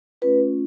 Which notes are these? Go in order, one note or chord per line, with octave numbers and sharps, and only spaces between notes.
A3 C#4 F4 B4